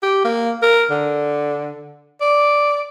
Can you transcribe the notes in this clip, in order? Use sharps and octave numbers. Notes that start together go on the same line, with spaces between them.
G4
A#3
A#4
D3
D5